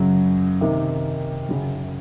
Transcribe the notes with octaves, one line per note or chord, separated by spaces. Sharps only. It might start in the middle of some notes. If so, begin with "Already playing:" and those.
Already playing: F#2 C#3 F#3
C3 D#3 A#3
F#2 C#3 F#3